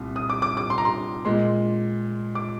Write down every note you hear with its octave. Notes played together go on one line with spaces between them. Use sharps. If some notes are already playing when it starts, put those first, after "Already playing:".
Already playing: C2 A#2
D#6
D6
D6
D6
C6
A#5
C6
A#2 G#3 C6
D6